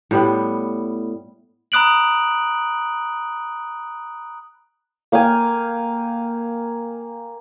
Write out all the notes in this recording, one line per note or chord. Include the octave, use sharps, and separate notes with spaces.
A2 G3 B3
A#5 B5 D#6 F#6 D7 F#7
A#3 F5 G5 G#5